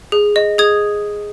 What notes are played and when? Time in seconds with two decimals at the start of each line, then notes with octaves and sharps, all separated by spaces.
0.12 G#4
0.36 D#5
0.58 G#4 D#6 G#6